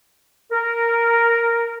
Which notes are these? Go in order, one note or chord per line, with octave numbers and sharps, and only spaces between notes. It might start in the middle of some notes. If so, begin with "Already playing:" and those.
A#4